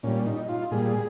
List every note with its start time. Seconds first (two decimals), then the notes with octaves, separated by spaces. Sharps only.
0.03 A#2 G3 C#4
0.26 D#4
0.49 F4
0.71 A#2 G3 G#4